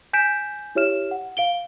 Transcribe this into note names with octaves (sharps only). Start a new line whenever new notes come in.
G#5 G6 B6 D7 E7
E4 G4 C#5 E5 F6 E7
F#5
F5 D7 G7